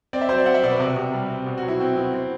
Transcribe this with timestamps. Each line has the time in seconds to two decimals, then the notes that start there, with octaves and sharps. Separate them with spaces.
0.13 C4 D5
0.21 E5
0.29 F#3 C5
0.38 D5
0.46 C4 F#5
0.54 E5
0.63 B2 D5
0.71 B4
0.80 C3
0.96 C3
1.13 G3
1.30 C4
1.46 B2
1.58 F#4
1.63 F#3
1.68 E4
1.80 C4 F#4
1.97 B2 E4
2.14 C4